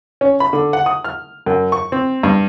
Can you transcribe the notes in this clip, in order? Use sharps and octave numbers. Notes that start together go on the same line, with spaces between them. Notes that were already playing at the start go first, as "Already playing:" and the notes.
C#4
B5
D3
F#5
D#6
F6
F#2
C#6
C4
G2